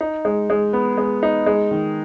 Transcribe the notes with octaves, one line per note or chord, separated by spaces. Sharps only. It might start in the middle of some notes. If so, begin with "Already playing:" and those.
D#4
G#3
G#3
B3
G#3
D#4
G#3
D#3